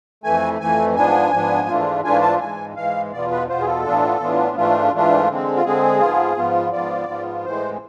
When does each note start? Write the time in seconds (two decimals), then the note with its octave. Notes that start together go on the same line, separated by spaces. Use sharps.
0.24 F2 E3 A3 G#5
0.60 F2 E3 A3 G#5
0.96 G#2 F3 B3 D4 G#5
1.32 G#2 F3 B3 D4
1.68 G#2 E3 A3 D4 F4
2.04 G#2 E3 A3 D4 F4 G#5
2.22 A5
2.40 G#2 E3 G#3 G#5
2.76 G#2 E3 G#3 F5
3.13 E2 B2 B3 F4 D5
3.31 B4
3.48 E2 B2 B3 F4 C5
3.60 G#4
3.66 A4
3.85 A2 E3 B3 D4 F4
4.20 A2 E3 B3 D4 F4
4.56 G#2 E3 A3 D4 F4
4.93 G#2 E3 A3 D4 F4
5.28 D3 G#3 C4
5.56 F4
5.65 D3 G#3 C4 G#4
6.00 G#2 F3 B3 F4
6.37 G#2 F3 B3 F4
6.72 G#2 F3 B3 F4 D5
7.08 G#2 F3 B3 F4
7.45 A2 E3 G#3 C5